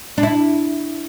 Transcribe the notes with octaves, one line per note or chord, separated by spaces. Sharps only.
D4
E4